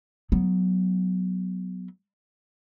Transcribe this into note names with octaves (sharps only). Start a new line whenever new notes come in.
F#3 B3